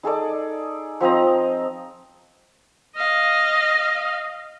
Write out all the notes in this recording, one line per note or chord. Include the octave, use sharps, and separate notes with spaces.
D#4 G#4 A4 D5
F3 C4 D#5 A#5
D#5 F5